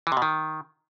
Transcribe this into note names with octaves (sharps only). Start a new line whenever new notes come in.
E3
C3
B2
D#3